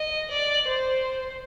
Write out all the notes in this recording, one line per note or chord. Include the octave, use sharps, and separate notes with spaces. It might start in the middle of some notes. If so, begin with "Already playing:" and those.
Already playing: D#5
D5
C5